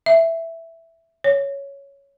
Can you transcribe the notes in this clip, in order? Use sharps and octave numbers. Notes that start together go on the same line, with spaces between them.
E5
C#5